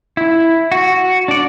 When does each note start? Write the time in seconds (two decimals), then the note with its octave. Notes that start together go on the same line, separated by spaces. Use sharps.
0.17 E4
0.72 F#4
1.28 D4 D5